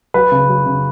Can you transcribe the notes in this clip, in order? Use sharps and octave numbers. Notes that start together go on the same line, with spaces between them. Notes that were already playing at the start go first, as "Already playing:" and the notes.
F#3 B4
C#3
F#3
C#3